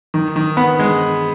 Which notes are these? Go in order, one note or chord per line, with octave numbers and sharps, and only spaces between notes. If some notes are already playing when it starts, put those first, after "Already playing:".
D#3
D#3
B3
G#3